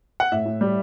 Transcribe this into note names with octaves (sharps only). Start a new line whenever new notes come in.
F#5
A2 E5
A2
G3